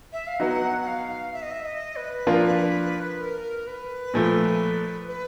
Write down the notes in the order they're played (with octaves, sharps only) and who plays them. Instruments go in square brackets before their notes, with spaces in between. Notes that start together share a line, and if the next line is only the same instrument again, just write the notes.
[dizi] E5
F5
[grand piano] F#3 B3 D#4 [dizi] F#5
[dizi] F#5
F5
E5
D#5
E5
D#5
B4
[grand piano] F3 A#3 D4 F4
[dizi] A#4
B4
[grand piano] A#2 F3 A3
[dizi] B4